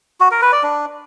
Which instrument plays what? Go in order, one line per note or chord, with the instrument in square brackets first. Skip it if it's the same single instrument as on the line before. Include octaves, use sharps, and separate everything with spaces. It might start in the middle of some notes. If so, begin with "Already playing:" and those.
[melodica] F#4
A#4
B4
D5
D4